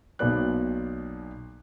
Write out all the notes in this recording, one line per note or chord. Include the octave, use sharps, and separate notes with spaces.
B1 B2 A#3 B4 D5 F#6